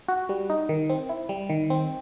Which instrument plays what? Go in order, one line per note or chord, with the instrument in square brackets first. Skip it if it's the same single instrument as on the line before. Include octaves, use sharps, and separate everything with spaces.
[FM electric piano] F#4
G3
D#4
D#3
C4
E4
G3
D#3
C4